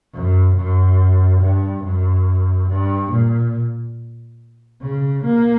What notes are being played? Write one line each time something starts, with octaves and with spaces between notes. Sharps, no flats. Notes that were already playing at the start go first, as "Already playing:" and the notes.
F#2
F#2
G2
F#2
G2
A#2
C#3
A#3